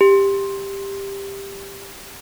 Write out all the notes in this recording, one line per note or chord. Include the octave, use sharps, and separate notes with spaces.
G4